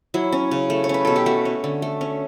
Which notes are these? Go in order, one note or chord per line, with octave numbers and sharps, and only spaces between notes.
F#3 E4
C#4
C#3
A3
C#5
C#4 B4
B2 A4
G4
A3 F#4
C#4
D3
A3
C#4